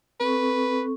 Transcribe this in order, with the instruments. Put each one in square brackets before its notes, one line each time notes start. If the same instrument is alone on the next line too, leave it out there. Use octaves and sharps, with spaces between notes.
[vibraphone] C4 A4 C#6 [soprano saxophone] B4